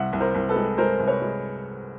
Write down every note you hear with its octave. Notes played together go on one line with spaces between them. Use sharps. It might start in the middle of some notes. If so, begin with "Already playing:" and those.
Already playing: C2 E5 F#5
C2
A#4 C5
C2
A4 B4
G#3
G#3 A#4 C5
C2
B4 C#5
G#3